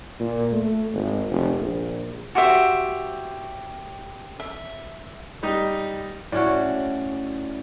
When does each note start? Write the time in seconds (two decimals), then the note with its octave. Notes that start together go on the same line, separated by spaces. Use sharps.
0.20 A#2
0.52 A3
0.94 G#1
1.30 F1
1.60 A#1
2.35 F#4 G4 C5 E5
4.40 E5
5.43 G3 D#4 G4
6.32 A2 C#4 F#4 D5